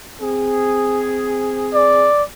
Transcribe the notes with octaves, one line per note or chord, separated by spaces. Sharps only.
C4 G#4
D5